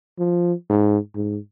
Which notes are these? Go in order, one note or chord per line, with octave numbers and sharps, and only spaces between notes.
F3
G#2
G#2